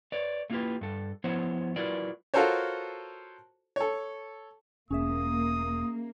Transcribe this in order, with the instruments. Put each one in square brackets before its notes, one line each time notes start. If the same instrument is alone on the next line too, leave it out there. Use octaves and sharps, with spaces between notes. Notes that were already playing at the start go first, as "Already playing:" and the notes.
[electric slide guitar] B4 C#5 D5
A3 A#3 E4 F4 G4 B4
G2 A4
F3 B3 E4 C5 C#5
F#3 E4 F4 A#4 B4 D5
[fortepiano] F4 F#4 A4 A#4 C5 C#5
A4 C#5
[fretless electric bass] E1 [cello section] A#3 [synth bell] C#4 G#4 E5 [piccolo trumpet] D#6